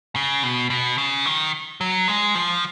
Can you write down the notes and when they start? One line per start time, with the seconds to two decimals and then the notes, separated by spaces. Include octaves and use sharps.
0.16 C#3
0.43 B2
0.70 B2
0.98 C#3
1.26 D#3
1.81 F#3
2.08 G#3
2.35 F3